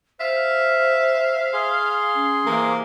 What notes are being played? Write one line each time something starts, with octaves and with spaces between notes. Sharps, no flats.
C5 E5 F5
G#4 C6
C#4
C3 E3 A#3